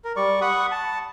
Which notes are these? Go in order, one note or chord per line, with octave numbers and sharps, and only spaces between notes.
A#4
G3 D5 C#6
F#5 B5 C#6 D#6
A5